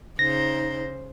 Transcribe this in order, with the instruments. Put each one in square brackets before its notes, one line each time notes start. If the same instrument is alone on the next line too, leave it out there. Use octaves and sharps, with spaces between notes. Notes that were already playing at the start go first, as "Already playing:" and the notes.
[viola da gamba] C#3 C5 [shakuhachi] D#4 [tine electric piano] A#6